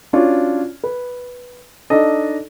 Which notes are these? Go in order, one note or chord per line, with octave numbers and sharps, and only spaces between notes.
C#4 D4 F4 F#4 C#5
B4
D4 D#4 A4 D#5